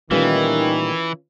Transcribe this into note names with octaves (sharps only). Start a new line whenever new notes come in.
A#2 D#3 E3 G3 A3 C#4 F4 B4